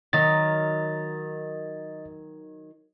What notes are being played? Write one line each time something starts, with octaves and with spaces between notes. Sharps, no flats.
D#3 F#3 D#5 A6